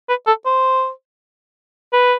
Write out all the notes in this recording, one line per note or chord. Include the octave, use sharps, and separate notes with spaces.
B4
A4
C5
B4